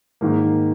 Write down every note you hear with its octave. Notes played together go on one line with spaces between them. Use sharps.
G#2 D#3 A#3